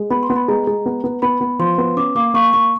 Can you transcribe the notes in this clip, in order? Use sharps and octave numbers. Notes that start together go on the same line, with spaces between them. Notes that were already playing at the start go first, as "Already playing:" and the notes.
Already playing: G#3
B3 B5
C6
B3
B5
G#3 A#5
G#3
B3
B3
B3 B5
B3
F3 C6
B3
C#4 D6
A#3 D6
A#3 C#6
A#3 C#6